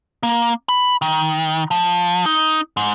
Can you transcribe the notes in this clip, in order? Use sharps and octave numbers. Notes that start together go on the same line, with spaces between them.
A#3
B5
D#3
F3
D#4
G#2